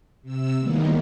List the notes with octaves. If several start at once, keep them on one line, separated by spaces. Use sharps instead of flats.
C3 E6
D#3 E3 G3 G#3 A#3 B3